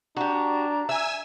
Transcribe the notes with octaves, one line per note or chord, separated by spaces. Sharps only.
D4 F#4 G4 A#5
E5 G#5 E6